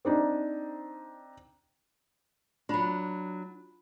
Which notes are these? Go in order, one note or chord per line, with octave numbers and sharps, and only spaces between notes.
C4 D4 D#4
F#3 D4 F4 B5